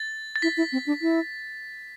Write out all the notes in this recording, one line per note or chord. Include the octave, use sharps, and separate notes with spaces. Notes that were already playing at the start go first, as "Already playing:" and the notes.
Already playing: A6
A6
E4 B6
E4
C4
D4
E4